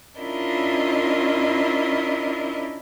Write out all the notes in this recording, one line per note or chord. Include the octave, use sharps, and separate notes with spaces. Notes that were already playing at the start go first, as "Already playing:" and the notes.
C#4 D4 E4 F4 A#4 D#5